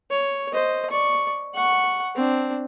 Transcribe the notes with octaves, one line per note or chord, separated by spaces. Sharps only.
C#5
C5 D#5
D5 C#6
F#5 C#6
C4 D4